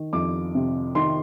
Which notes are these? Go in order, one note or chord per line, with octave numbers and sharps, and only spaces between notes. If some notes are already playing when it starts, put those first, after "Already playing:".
Already playing: D#3
F2 D6
C3
D#3 C6